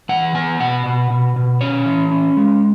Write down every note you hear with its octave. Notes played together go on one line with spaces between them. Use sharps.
E3 F#5
B3 G#5
B2 F#5
B2
B2
B2
C#4 C#5
E3
C#4
G#3